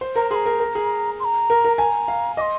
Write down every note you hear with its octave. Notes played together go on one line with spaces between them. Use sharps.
C5
A#4 A#5
G#4 A#5 C6
A#4
A#4
G#4
C6
A#5
A#4
A#4
G#5 A#5
F5
D#5 C6 D6